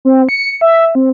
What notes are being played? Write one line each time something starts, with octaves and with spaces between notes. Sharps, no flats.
C4
C#7
E5
C4